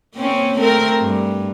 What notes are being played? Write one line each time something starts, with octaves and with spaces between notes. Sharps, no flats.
A#3 C4 C#4
A3 C4 A#4
G2